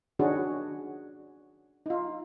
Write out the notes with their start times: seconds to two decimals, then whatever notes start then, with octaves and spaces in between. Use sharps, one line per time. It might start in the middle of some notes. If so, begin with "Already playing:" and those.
0.19 D#3 C#4 D4 F#4 G#4
1.86 D#4 F4